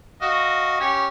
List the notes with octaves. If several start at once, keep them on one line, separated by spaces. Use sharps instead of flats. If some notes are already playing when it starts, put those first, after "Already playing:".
F#4 D#5 F5
C#4 G4 C#5